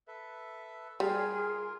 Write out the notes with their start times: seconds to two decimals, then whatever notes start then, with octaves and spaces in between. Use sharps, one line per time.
0.08 A4 B4 E5
1.00 G3 F4 G#4 A#4